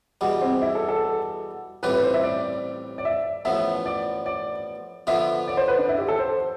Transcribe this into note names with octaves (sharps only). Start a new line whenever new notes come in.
E2 B2 G3
C4
E4
A4
A4
A1 A2 G3 C4 F4 B4
B4
C5
E5
D5
D5
E5
A1 A2 F3 B3 E5
D5
D5
D3 F3 B3 F4 E5
D5
C5
B4
D4
E4
G4
A4
C5